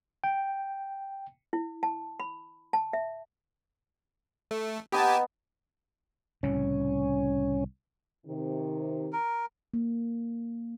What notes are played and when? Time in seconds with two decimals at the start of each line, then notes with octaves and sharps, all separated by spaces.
0.24 G5
1.53 E4
1.83 A5
2.20 B5
2.73 A5
2.93 E5
4.51 A3
4.92 B3 D#4 G4 G#5 A5
6.43 C2 A2 C#3 C#4
8.27 C3 D#3
9.13 A#4
9.74 A#3